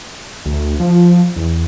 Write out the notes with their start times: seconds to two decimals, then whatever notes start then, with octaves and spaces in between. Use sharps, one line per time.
0.46 D2
0.80 F3
1.37 E2